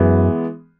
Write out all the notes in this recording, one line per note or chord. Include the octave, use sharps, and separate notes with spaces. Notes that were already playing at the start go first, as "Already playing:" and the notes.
Already playing: F#2 E3 G#3 B3